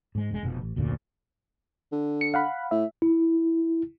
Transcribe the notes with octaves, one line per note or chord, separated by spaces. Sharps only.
G#2 G#3
E1 G#3
F1 F2 B2 F3
A1
F1 D2 A#2 C#3
D3
C#7
F5 F#5 B5
A2 E5
E4